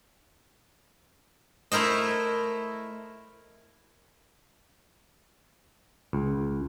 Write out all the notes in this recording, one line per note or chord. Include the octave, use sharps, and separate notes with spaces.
A3 E4 A#4 C5 D#5
C#2